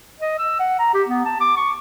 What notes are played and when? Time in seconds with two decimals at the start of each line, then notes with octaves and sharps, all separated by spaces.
0.20 D#5
0.39 E6
0.59 F#5
0.79 A#5
0.94 G4
1.08 B3
1.25 A5
1.41 D6
1.57 C#6